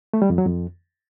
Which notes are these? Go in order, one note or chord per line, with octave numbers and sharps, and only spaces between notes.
A3
G3
F2
F#3
F2